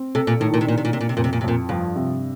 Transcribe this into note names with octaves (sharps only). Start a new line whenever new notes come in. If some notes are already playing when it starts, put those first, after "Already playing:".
Already playing: C4
C3 A4
A#2
A2 D#3
A#2
C3
A#2 D4
C3
A#2
C3 A#3
A#2
C3
F2 A#2
C3
A#2
C3
F2 A#2
G2 F3
C3